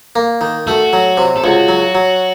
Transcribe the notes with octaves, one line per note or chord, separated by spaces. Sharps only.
A#3
D#3
A3 F#4
F#3
C3
A4
C#2 F#4
F#3
F#3